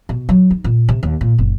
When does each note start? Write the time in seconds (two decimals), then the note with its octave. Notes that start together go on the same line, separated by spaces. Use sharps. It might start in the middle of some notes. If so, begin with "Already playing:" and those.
0.09 B2
0.29 F#3
0.50 D#4
0.64 A#2
0.89 C3
1.03 D#2
1.21 A#2
1.38 F#1